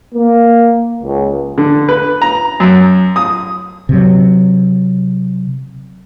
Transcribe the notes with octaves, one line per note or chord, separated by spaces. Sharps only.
A#3
C#2
D3
B4
A#5
F#2
D#6
C3 F#3